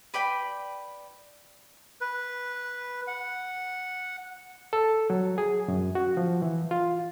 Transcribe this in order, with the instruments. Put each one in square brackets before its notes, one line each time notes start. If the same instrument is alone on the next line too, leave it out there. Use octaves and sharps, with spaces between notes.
[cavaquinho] B4 D5 G5 B5
[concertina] B4
F#5
[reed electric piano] A4
F#3
G#4
F#2
F#4
F3
E3
F4